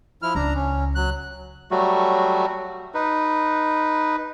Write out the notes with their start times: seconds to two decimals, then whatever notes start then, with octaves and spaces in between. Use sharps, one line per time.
0.22 F3 E4 F6
0.35 C#2 D4 A#5
0.55 C#4
0.95 F#3 F#6
1.71 F#3 G3 A3 F#4
2.94 D#4 B4